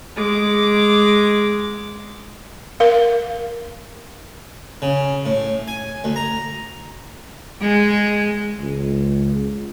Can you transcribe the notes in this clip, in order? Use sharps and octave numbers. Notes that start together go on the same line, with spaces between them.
G#3 D6
A#4 F5
C#3
A2
G#5
D2
A#5
G#3
C#2